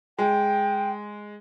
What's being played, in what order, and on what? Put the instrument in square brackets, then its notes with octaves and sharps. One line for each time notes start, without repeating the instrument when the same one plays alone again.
[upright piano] G#3 [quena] G5